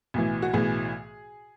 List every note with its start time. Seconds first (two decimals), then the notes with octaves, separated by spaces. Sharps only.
0.14 B1 A2 E3
0.42 F#4
0.53 B1 A2 E3 G#4